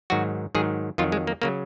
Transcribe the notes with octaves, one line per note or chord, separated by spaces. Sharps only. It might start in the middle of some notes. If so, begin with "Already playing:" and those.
G#2 D#3 F#3 F#4
G#2 D#3 F#3 G#4
F2 D#3 F#3 F4
G#3
A#3
C#3 F#3 A#3